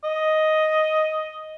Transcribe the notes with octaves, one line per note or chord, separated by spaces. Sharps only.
D#5